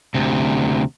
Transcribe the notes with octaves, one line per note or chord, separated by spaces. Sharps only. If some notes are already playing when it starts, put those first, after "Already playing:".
D2 C3